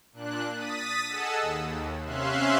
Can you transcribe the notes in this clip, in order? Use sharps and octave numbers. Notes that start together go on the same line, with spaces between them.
A#2 D4 F#6
D#6 A6 B6 D#7
G#4 A4 D#5 F#5 A5 E6
D#2
C3 C#4 E5 F5 C6 F#6